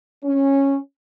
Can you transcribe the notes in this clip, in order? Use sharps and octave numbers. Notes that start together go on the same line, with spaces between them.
C#4